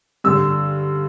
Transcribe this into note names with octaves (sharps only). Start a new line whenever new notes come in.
G2 D3 E6